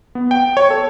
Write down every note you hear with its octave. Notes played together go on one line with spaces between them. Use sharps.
B3
G5
C#5
A4